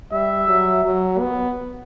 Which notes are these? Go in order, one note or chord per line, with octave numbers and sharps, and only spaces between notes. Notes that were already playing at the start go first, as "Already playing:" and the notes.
G3 E5
F#3
F#3
B3